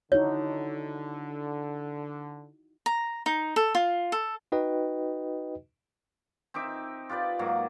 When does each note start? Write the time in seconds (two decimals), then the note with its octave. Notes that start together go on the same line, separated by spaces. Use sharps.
0.12 D3 D#4 E4 F#4 C#5
2.86 A#5
3.26 D#4
3.56 A4
3.75 F4
4.12 A4
4.52 D#4 F#4 B4 D#5 G5
6.54 C4 D#4 E5 D6
7.10 F4 G4 B4 D5
7.39 G#2 F#3 A#3